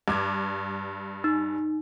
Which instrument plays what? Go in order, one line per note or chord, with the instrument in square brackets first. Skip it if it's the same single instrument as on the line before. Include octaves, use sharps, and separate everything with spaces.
[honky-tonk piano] G2 D6 G#6
[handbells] D#4